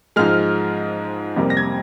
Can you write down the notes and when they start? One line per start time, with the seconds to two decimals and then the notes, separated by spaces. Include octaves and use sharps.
0.16 G#2 F3 G#3 F6
1.36 F2 C3 G3 A#3
1.50 A#6
1.57 G#6